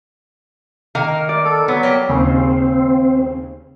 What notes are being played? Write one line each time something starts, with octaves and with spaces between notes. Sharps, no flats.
D#3 A#3 A#4 F5
D5
A4
F#3 B3
A#3 G4
D#2 C#3 C4